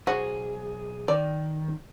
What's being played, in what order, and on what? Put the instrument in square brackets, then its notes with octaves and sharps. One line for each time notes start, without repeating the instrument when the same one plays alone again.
[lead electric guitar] B1 G#4 [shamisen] F#4 [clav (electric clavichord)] C5
[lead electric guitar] D#3 [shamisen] D5